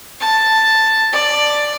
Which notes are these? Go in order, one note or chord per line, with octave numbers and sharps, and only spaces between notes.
A5
D5